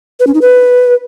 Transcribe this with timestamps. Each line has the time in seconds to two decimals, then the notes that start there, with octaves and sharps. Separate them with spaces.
0.20 B4
0.27 C#4
0.34 D#4
0.42 B4